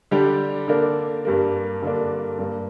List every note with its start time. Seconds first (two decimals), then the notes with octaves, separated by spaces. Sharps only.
0.11 D3 G3 D4 G4
0.68 D3 A#3 D4 A#4
1.25 G2 G3 A#3
1.82 G2 D3 A#3 D4
2.39 G2 G3 A#3